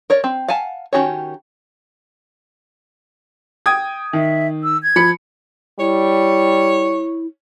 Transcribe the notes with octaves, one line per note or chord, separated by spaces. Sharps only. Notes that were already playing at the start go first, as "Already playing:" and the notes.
A#4 C#5 D5
C4
F5 F#5 G#5 A5
D#3 C#4 F#4 G4 C#5
G5 D#6 G#6
D#3 E5
E6
G#6
F3 B5 C#7
G3 E4 C#5